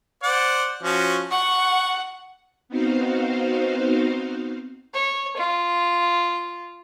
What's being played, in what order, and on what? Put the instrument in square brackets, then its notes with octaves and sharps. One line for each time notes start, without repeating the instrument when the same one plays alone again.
[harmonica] C5 D5 F#5
F3 C#4 F#4
[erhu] F#5 [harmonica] C#6
[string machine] B3 C4 D#4 F#4 C5 F5
[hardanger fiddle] C#5
F4